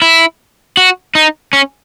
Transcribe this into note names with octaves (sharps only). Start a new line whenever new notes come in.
E4
F#4
D#4
C#4